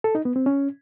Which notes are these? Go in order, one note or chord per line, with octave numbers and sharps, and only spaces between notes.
A4
D#4
B3
C4
C#4